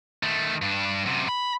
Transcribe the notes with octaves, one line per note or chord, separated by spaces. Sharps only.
D#3 A3
G2 D4
F#2 C3
B5